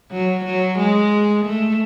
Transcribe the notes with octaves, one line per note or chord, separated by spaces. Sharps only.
F#3
F#3
G#3
A3